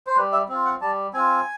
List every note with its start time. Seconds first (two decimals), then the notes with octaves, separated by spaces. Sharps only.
0.07 C5
0.16 G3 B4
0.32 E5
0.49 C4 F4
0.65 F#5
0.81 G3 A5
1.13 C4 F4 G#5